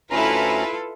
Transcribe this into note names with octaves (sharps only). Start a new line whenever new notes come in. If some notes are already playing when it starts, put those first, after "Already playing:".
D2 C#4 E4 F4 A4 B4 A#5